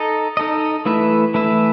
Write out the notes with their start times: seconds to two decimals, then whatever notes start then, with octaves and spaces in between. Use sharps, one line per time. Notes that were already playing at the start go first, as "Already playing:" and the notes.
Already playing: D#4 A4 D#5
0.37 D#4 A4 D#5
0.86 E3 A3 E4 B4 E5
1.34 E3 A3 E4 B4 E5